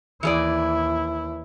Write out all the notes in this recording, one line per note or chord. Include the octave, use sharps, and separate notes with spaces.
D#2 E3 E4 G#4 D5